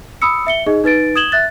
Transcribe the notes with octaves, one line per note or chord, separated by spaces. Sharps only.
B5 D#6 E6 C#7
E5 C#7 G7
D#4 G#4 D#5
D#4 B4 A6 D7
D#6 G#6 E7 F#7 G7
E5 F#6 A6